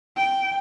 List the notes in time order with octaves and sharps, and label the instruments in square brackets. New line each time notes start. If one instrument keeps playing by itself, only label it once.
[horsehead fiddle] G5